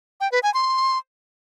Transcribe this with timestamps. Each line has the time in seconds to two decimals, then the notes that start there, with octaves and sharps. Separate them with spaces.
0.21 G5
0.32 B4
0.43 G#5
0.54 C6